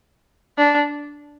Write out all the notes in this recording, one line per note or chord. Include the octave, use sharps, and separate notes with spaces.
D4